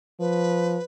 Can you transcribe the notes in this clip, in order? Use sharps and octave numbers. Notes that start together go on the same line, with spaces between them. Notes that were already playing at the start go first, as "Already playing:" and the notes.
F3 B4